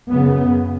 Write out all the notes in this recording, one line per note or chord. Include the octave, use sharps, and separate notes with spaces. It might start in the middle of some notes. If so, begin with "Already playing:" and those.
F#2 C#3 B3